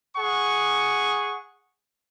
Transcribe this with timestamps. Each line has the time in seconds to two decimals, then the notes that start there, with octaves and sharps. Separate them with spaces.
0.17 G#4 F#5 C#6